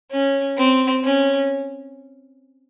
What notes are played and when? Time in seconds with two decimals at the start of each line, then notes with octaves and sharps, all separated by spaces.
0.11 C#4
0.57 C4
1.04 C#4